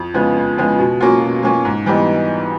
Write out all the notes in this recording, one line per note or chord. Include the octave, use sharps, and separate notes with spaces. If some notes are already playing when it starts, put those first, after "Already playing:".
Already playing: F2
C#3 F3 G#3 B3
F2
C#3 F3 G#3 B3
B2
F#3 A#3 C#4 F4
B2
F#3 A#3 C#4 F4
G#2
E3 G3 B3 D#4